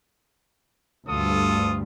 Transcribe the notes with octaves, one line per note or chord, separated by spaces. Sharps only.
D2 G2 F4 A4 D#6